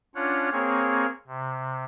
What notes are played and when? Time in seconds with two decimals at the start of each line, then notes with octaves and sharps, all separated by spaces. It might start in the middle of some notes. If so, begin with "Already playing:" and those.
0.15 C#4 D4 F4 C#5 F#5
0.52 A#3 C4 G#4 C#5
1.27 C3